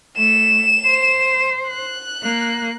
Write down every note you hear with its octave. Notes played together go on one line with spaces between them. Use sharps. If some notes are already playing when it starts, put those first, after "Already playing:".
A3 E7
C5
F#6
A#3